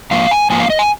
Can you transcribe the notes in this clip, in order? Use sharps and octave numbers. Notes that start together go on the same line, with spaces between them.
G#2 F3 A#3 F5
G#5
G#2 F3 A#3 G#5
F5
D#5
G#5